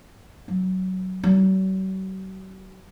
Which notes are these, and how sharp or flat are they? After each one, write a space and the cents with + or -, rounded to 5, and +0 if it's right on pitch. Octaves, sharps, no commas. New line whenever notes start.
F#3 +10
F#3 +45